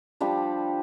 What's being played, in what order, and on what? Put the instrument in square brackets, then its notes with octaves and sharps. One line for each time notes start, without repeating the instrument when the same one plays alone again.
[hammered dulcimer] F3 G3 D4 G4